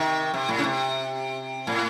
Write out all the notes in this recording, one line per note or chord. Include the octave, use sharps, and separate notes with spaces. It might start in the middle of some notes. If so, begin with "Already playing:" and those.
Already playing: C3 D#3
C3
A2
C#3
C3
A2